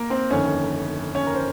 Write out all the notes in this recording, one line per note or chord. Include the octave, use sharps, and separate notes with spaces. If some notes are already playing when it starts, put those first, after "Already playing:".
Already playing: A#3 A#4
C4 C5
G1 F2 D#3 C#4 C#5
C#4 C#5
A#4
C5